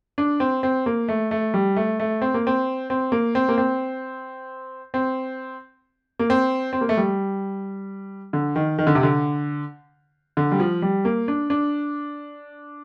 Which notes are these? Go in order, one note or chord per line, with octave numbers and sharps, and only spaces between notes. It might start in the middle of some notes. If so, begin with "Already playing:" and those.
D4
C4
C4
A#3
A3
A3
G3
A3
A3
C4
A#3
C4
C4
A#3
C4
A#3
C4
C4
A#3
C4
C4
A#3
A3
G3
D3
D#3
D#3
D3
C3
D3
D3
G3
F3
G3
A#3
D4
D4